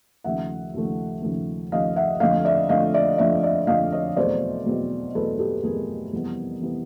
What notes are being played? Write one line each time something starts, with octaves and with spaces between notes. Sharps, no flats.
D#2 C#3 F3 A3 E5 F#5
D#2 C#3 F3 A3
D#2 C#3 F3 A3
D#2 C#3 F3 A3 D#5 F5
E5 F#5
F2 D3 F3 A3 D#5 F5
D5 E5
F2 D3 F3 A3 D#5 F5
D5 E5
F2 D3 F3 A3 D5 E5
D5 E5
F2 D3 F3 A3 D#5 F5
C#5 D#5
E2 B2 F#3 A3 C4 C5 D5
E2 B2 F#3 A3 C4
E2 B2 F#3 A3 C4 A4 B4
G4 A4
E2 B2 F#3 A3 C4 G#4 A#4
F2 C3 E3 G3 B3
C3 E3 G3 B3